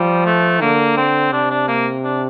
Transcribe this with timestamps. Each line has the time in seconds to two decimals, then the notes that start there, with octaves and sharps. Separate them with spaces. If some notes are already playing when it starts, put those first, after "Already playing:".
Already playing: F3 G3
0.26 A3
0.61 D3 A#3
0.97 C4
1.32 C3 D4
1.50 D4
1.68 A#3
2.04 D4